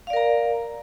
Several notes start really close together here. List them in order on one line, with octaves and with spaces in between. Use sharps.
F5 D5 A#4 A#5